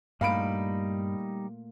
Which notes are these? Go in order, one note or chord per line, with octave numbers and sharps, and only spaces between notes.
G2 A#2 G3 A3 D#4 F5 B5 D7